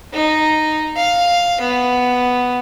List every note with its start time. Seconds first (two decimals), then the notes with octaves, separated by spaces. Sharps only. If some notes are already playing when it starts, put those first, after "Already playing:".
0.13 D#4
0.96 F5
1.61 B3